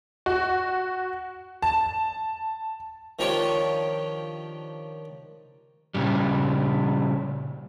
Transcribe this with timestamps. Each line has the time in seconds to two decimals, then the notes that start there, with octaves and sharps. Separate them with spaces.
0.26 F#4
1.62 A5
3.19 D#3 F3 D4 F4 G4 C#5
5.95 A#2 C#3 G3